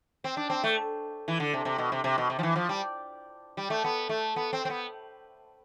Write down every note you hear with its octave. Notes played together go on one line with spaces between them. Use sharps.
C4
D4
C4
A3
E3
D3
C3
C3
B2
C3
C3
B2
C3
F3
E3
F3
G3
G3
A3
B3
A3
B3
C4
C4
B3